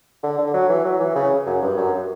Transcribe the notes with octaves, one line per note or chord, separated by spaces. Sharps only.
D3
D3
F#3
E3
F#3
E3
C#3
F#2
G2
F#2